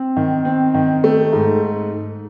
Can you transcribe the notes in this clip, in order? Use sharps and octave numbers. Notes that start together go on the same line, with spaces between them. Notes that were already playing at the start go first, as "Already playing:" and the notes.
Already playing: C4
D#3
C4
D#3
A3
G#2